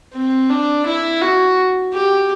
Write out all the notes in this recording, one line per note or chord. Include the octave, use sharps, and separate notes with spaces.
C4
D4
E4
F#4
G4